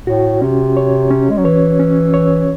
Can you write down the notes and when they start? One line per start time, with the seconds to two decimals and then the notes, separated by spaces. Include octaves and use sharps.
0.07 A2 F#4
0.42 C3 C#4
0.77 C#5
1.11 C#4
1.30 G#3
1.38 F#3
1.45 E3 C#5
1.79 C#4
2.14 C#5